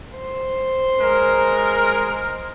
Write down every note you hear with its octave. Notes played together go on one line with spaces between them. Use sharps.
C5
G#3 A#4